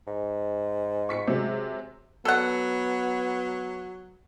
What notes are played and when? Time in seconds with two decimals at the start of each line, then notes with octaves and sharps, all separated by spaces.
0.07 G#2
1.09 C#6 B6 C#7
1.27 C3 F#3 G#3
2.25 F#3 B3 A4 F#5